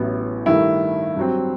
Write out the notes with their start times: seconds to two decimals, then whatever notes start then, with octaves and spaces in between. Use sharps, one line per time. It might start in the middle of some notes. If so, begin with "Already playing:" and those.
Already playing: A1 A2 F#3 B3
0.46 G2 D#3 A3 E4
1.16 G2 F#3 C4